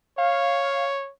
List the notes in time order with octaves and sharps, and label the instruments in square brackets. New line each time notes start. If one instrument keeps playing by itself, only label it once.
[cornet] C#5 [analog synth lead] F5